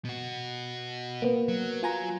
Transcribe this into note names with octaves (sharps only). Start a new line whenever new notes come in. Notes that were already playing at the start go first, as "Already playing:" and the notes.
B2 F#4
A#3 B3
F#3
F4 G#5 A#5